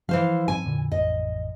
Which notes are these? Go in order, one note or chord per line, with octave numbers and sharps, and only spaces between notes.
E3 F3 C5 F5
G#2 F3 C4 G#5
F2 A#2 D3
A1 F2 D#5